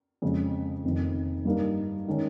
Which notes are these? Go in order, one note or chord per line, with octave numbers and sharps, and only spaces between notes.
F2 C#3 G#3
F1 F2 D#3
G2 G3 A#3 D#4
D#3 G#3 C#4